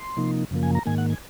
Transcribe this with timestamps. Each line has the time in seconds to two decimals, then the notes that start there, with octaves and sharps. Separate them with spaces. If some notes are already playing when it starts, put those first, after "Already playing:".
Already playing: C6
0.17 C3 F3 A#3 D#4
0.51 F#2 C#3 F3 A#3
0.63 G#5
0.75 A#5
0.86 G#2 D#3 A#3 G#5
0.98 F#5
1.10 G#5